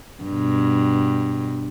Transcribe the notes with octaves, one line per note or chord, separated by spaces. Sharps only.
G2 B2